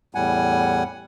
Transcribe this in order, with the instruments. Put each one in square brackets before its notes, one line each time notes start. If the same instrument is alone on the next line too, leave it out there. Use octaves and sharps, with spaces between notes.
[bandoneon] E2 A2 G3 F#5 G#5